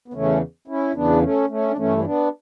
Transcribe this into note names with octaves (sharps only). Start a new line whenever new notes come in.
B3
E2 C#3 E3 A3 C#4
C#4 E4
E2 C#3 E3 B3 D4
A3 C#4
A3 C#4
D4
G2 E3 A3 C#4
C#4
B3 D4